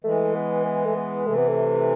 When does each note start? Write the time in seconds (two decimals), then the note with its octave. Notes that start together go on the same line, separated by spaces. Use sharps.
0.04 E3 G#3 A3
0.34 B3
0.65 B3
0.85 A3
0.96 B3
1.26 C3 E3 A3
1.37 B3
1.48 A3